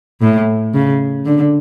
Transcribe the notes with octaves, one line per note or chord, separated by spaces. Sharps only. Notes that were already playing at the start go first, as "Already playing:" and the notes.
A2
C#3
D3